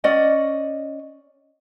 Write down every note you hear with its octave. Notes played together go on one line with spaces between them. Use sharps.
C#4 D5 D#5 F#5